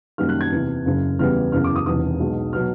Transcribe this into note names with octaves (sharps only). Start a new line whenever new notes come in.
F#2 D#3 G3 A#3 F6
F#6
G#6
E2 C3 E3
F#1 F#2 C#3
E2 C#3 E3 G3 B3 F6
F#1 E2 C#3 F6
D6
D#6
E1 E2 C3 D#3 D#6
B1 B2 G#3
B2 F#3 B3 F6